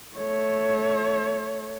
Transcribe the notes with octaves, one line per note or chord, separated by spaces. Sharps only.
A3 C#5